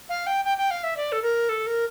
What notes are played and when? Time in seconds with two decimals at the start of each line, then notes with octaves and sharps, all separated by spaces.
0.09 F5
0.27 G5
0.45 G5
0.58 G5
0.71 F5
0.84 E5
0.97 D5
1.12 A4
1.22 A#4
1.49 A4
1.67 A#4